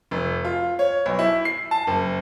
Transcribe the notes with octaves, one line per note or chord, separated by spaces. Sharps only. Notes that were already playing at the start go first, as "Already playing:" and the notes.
F1
F4
C#5
B1
E4
C7
A5
F#1